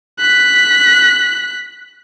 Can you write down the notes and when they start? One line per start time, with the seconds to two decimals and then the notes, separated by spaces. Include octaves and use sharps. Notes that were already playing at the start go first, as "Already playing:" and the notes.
0.19 F#6 B6